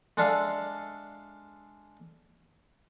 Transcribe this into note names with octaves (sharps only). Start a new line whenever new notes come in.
G#3 D4 A4 E5 F5